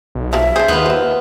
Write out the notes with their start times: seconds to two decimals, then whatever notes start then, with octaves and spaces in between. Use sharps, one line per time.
0.15 B1
0.33 F3 G3 A#3 E5
0.56 D4 G#4 C5
0.68 D#2 B3 F4
0.86 C5 E5